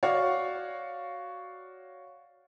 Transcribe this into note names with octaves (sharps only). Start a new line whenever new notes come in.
F#4 C#5 D5 F5 F#5